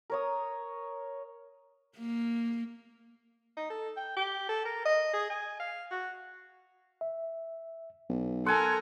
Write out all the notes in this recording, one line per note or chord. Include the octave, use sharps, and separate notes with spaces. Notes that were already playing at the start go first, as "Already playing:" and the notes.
A#4 C#5 D#6
A#3
D#4
A4
G5
G4
A4
A#4
D#5
G#4
G#5
F5
F#4
E5
B1
A4 A#4 F#5 G#5 C6